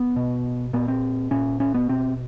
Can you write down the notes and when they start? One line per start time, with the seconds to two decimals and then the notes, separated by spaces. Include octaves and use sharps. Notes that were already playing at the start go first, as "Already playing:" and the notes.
Already playing: B3
0.16 B2
0.73 A#2 B3
0.88 C4
1.31 A#2 C#4
1.60 C#4
1.74 B3
1.89 B2 C4